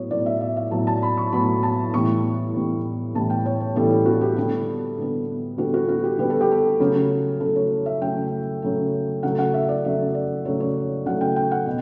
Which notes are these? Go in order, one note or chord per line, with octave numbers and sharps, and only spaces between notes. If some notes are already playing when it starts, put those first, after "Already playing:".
Already playing: A2 F#3 B3 C#5
A2 F#3 B3 D5
E5
E5
E5
A2 F#3 B3 A5
A5
B5
C#6
A2 F#3 B3 B5
A5
A2 E3 G3 B3 C#6
A2 E3 G3 B3
A2 E3 G3 B3 A5
G5
C#5
C#5
A2 E3 G3 B3 A4
G4
F#4
G4
D3 G3 B3 A4
D3 G3 B3
D3 G3 B3 F#4
F#4
F#4
G4
D3 G3 B3 B4
A4
G4
A4
C#3 F#3 A3
C#3 F#3 A3 A4
C#5
E5
C#3 F#3 A3 G5
C#3 F#3 A3
C#3 F#3 A3 F#5
F#5
E5
D5
C#3 F#3 A3 E5
D5
C#3 F#3 A3 C#5
C#5
C#3 F#3 A3 F#5
G5
G5
F#5
B2